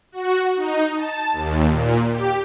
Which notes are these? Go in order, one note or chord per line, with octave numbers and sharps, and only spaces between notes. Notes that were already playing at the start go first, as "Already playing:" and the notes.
F#4
D#4
A5
D#2
A#2
G4